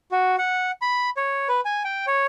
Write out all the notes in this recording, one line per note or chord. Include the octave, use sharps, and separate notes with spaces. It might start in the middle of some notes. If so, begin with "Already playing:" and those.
F#4
F#5
B5
C#5
B4
G#5
G5
C#5